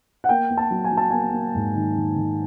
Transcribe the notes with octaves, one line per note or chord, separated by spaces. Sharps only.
F#5
A#3 G5
A#3
A5
F#3
G#5
F#3
A5
A#3 G#5
A#3
G#2
D#3
D#3
D#3